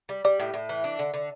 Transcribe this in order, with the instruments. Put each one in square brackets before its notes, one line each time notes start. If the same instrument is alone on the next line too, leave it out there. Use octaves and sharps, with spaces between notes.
[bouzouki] G3
[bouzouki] G3 [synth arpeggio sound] D5
[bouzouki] A2
A2
E3
D4
D3
D3